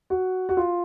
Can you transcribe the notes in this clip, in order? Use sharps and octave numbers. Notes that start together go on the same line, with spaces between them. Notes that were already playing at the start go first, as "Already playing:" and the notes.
F#4
F#4
F4